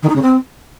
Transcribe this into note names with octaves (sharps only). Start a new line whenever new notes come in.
D#3
D#4
C#3
C4